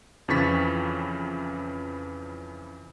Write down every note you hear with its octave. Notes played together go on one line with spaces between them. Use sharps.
F2 C#3 E3 C#6 A6 B6